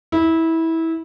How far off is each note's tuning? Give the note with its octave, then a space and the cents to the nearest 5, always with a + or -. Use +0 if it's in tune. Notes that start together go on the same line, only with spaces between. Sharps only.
E4 -20